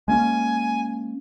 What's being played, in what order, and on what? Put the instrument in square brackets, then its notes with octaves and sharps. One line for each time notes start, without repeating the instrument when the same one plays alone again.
[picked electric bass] G#3 A#3 C#4 [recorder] G#5